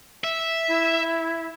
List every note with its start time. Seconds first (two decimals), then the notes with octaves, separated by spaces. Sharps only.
0.24 E5
0.67 E4